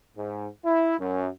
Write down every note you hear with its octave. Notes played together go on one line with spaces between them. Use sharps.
G#2
E4
F#2